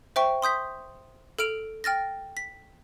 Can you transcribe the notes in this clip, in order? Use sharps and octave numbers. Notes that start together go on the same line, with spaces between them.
C5 E5 G5 C#6
C6 D#6 G6 B6
A4 F6 D7 F7
G5 F6 A6 A#6
B6